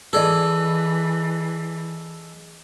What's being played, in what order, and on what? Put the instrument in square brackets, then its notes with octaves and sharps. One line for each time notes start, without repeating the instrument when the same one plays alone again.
[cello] E3 [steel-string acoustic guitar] G#4 D#5 [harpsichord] A4 D5